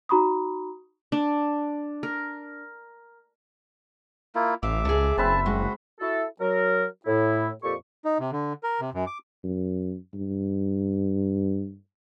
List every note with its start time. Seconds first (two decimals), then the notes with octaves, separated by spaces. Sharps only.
0.09 D#4 F#4 A#5 B5 C#6 D#6
1.12 D4
2.03 A#4
4.35 A#3 E4 F4
4.63 A1 E5 F5 D6
4.85 C#2 A3 G#4
5.18 F#1 C4 B4 E5 A5
5.46 G#3 F#4
6.00 E4 F#4 A4
6.40 F#3 A#4
7.06 A2 E4
7.63 F2 A#2 G4 A4 C#6
8.05 D#4
8.20 C3
8.32 D3
8.63 A#4
8.81 C3
8.94 F#2
9.07 D6
9.44 F#2
10.14 G2